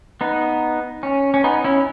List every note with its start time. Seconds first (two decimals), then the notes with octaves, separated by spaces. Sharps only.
0.21 B3 D#4
1.03 C#4
1.34 C#4
1.44 B3 D#4
1.64 C#4 E4